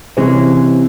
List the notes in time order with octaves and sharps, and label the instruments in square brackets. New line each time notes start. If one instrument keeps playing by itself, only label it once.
[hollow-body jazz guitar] C3 E3 G#3 C#4